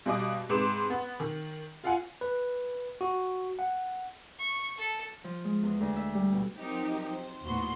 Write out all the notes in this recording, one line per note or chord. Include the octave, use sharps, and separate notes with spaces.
G2 B2 D#5 D6
G#2 C3 B4 D6 E7
B3
D#3
F4 F5 F#5 G#5
B4
F#4
F#5
C#6
A4
F3
G#3
E2
D2
E5
G3
B2
F3 F#3 C4 D#4 G4 A#4
C5
D#2 A2 B3 F#4 C6